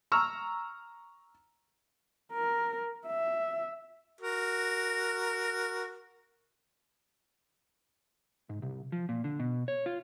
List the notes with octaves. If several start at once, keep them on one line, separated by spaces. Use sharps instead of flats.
A#5 C#6 E6 F6
A#4
E5
F#4 A#4
G#2
C2
F3
A#2
D3
B2
C#5
F4